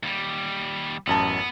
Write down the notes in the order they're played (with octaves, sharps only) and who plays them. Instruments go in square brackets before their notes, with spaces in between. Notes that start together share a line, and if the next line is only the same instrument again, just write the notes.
[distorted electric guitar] D#2 G3
[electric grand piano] A1 F#2 A5 [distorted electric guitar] B3